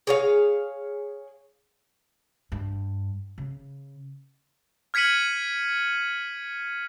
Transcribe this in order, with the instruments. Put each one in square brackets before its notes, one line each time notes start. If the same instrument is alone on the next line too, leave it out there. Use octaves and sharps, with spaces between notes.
[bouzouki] G#4 C#5 F5
[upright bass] G2
C#3
[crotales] F6 G#6 B6 C#7 D#7 F#7